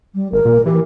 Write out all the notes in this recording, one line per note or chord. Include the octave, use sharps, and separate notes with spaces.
G3
G#1 A#4
A#2
E3 G4